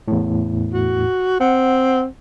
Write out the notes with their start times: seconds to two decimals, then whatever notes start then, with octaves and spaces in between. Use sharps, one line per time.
0.08 E2 A2
0.73 F#4
1.41 C4 F#5